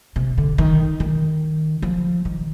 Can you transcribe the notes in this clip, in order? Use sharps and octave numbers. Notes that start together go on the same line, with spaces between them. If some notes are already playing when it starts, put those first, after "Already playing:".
C3
D3
D#3
D#3
F3
D#3